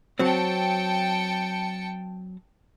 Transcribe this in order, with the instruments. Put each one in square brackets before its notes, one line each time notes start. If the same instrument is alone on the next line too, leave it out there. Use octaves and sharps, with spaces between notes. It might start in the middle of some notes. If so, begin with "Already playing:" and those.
[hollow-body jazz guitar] F#3 C4 [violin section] G5 A5 C#7